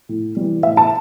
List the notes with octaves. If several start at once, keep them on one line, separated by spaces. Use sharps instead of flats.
A2
E3 G3
A2 E5
A5